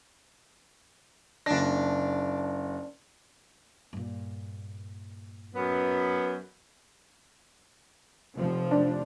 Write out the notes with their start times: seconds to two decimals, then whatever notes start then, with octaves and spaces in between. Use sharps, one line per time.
1.46 F#1 D4 A#6
3.93 G2 A#2
5.54 F#2 B3
8.36 F1 F3
8.71 D4